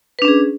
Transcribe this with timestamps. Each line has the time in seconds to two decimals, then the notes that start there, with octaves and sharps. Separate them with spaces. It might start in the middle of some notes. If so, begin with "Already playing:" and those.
0.19 B4
0.22 D4
0.25 C#4
0.28 G#4